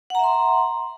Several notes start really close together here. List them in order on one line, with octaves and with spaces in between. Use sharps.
F#5 A#5 E5 C6